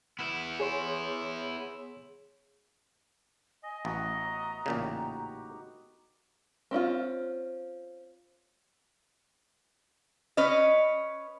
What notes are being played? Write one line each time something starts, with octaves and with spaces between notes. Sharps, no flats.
B3 E4
G#4 C#5 C6
D#5 G#5
A1 B3 F#4 E5 A#5
A1 A#2 C#3 D#4 F#4 G4
C4 C#4 E4 F4
C#4 B4 D#5